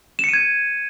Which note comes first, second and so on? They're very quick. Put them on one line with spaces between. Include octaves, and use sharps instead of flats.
E7 C#7 D#7 G#6